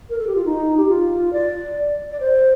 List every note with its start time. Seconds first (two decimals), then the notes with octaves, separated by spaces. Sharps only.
0.09 A#4
0.18 A4
0.27 G4
0.35 F4
0.45 D#4
0.77 G4
0.89 F4
1.33 D5
2.11 D5
2.20 C5